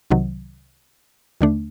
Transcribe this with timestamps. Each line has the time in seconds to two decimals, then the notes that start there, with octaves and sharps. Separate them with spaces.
0.11 C2 C3 D#3 F#3
1.41 D#2 D3 A3 D4